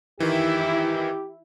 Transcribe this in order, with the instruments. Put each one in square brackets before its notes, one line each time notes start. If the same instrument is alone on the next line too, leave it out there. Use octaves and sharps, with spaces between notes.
[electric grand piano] D#3 E3 [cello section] E4 [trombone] G4